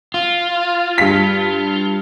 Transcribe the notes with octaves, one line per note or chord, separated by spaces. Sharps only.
F4
G2 B6